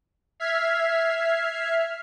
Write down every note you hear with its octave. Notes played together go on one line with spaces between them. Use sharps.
E5 F6 G#6 B6 C7